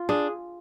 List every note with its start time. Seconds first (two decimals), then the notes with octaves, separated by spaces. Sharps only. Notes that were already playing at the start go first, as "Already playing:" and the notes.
Already playing: F4
0.09 D4 G#4